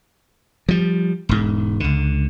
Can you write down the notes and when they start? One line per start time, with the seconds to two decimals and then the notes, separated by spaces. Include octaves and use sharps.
0.69 F3 G3
1.29 E1 G#2
1.80 C#2 D3